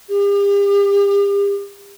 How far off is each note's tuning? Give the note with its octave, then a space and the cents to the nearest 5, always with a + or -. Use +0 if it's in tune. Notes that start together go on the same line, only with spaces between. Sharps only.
G4 +40